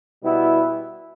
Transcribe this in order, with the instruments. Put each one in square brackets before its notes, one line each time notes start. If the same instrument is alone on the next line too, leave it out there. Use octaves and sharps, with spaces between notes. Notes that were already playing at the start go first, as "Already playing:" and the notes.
[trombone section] B2 G3 B3 E4